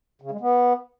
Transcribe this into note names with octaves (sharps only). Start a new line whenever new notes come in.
C#3
G#3
B3